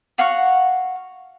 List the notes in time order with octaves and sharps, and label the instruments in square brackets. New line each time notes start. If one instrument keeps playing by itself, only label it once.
[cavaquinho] F#4 F5 F#5 C#6